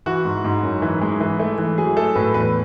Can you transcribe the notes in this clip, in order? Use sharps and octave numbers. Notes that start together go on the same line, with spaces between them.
E3 F#4
G#2
G#2
F#2
E3
G#3
E3
A3
E3
F#3 G#4
A3 A4
A2 B4
E2 B4